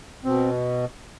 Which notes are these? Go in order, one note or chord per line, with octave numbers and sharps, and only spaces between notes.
B2 C4